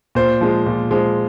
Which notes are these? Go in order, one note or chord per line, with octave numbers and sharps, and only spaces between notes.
A#2 C5
F3 G#3
A#2
F3 G#3